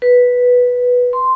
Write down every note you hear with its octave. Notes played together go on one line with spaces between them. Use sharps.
B4
C6